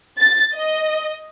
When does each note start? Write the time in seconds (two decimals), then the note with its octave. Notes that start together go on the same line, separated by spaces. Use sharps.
0.19 A6
0.55 D#5